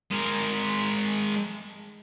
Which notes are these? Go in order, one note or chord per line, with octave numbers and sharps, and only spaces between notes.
G#3 A#4